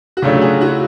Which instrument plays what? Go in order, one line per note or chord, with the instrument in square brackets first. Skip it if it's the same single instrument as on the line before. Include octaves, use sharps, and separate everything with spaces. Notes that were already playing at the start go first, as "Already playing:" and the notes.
[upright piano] F#4
[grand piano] C#3 F#3 A3 D4 [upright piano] F4 G4
[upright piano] F#4 G#4
E4 F#4